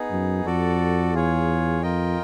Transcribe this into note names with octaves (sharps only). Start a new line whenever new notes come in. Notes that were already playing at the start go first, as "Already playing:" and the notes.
Already playing: B3 D#4 G#4
F#2
F2 F#4 A4 D5
E2 F4 G#4 C#5
F2 F4 A#4 D#5 G5